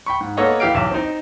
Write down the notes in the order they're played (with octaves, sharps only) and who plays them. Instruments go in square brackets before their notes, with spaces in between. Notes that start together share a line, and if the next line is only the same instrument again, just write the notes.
[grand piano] G5 B5 C#6
G#2
A#3 B3 A4 C#5 D#5 F#5
E3 E4 G4 F5 D7
B1 E2 E5 E7
C4 D#4